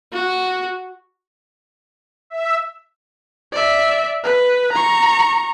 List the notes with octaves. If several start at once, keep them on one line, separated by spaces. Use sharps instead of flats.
F#4
E5
D5 E5
B4
A#5 C#6